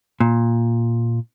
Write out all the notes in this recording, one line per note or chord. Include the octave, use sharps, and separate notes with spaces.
A#2